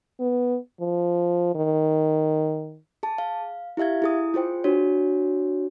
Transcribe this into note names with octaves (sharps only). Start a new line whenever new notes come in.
B3
F3
D#3
G#4 A5
F5
E4 G4 E5 F5 G#6
E4 G#4 D#6
F4 G#4 C5 G5
D4 F#4 C#5